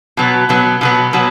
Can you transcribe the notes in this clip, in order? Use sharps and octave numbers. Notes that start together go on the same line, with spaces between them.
B2 F#3 B3
B2 F#3 B3
B2 F#3 B3
B2 F#3 B3